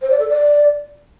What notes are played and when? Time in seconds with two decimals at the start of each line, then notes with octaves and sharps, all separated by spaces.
0.01 C5
0.10 D5
0.19 A4
0.28 D5